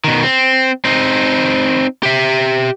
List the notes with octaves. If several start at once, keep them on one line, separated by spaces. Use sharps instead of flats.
B2 D#3
C4
C4 D#4
G4 E5